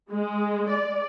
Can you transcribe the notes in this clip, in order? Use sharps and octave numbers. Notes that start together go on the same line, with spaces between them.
G#3
D5